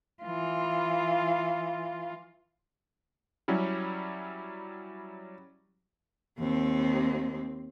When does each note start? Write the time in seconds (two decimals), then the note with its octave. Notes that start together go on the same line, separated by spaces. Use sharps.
0.23 E3 F4
3.48 F#3 G3 C#4 E4
6.39 D#2 C4